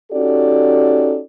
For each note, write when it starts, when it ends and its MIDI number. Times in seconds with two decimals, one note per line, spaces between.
0.12 1.20 61
0.12 1.20 63
0.12 1.20 66
0.12 1.20 67
0.12 1.20 69
0.12 1.20 74